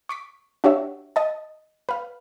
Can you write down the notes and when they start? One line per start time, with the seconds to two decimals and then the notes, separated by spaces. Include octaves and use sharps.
0.09 C#6 D6 B6
0.64 D4 F#4 G4 C#5 E5
1.16 D#5 A5
1.89 B4 F5